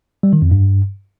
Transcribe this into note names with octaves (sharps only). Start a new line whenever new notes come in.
G3
D#3
F2
G2